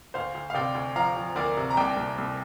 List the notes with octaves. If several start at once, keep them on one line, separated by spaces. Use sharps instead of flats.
D2 C5 F5
D2
F5
C3 D5 G5
D2
F3 F5 A#5
F3
D2 A#4 D5
C3
A#5
C2 D5 G5
C2
C2